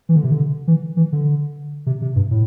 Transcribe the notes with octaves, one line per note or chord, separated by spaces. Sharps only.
E3
D3
C3
D3
E3
E3
D3
C3
C3
G2
A2